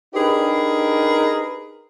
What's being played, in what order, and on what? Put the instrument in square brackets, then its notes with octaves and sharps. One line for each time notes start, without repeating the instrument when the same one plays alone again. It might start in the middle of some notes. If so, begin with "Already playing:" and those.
[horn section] D4 D#4 G4 G#4 A#4 B4